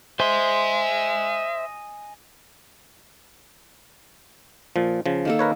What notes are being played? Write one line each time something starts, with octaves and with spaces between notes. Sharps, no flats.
C5 D#5 E5 G#5 C6
A#2 F3
C#3 F3
D#3 A#3 A4
A#4 B4 C#5